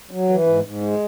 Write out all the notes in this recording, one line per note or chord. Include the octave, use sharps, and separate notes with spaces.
F#3
E3
G#2
G#2
G#3